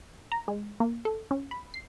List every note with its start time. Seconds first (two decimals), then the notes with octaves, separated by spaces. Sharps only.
0.32 A#5
0.48 G#3
0.80 A#3
1.05 A4
1.31 C#4
1.51 B5
1.74 C7